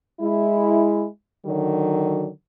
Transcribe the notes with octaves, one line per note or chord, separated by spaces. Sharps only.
G#3 E4
D3 D#3 F#3